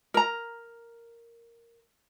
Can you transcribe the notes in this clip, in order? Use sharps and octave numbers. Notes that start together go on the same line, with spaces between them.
A#4 A#5